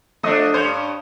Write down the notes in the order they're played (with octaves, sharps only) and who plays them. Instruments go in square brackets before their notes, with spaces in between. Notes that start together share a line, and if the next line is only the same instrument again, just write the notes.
[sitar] F3 D4 [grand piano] A3 D#5 D#6
[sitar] G2 C#4 [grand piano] C5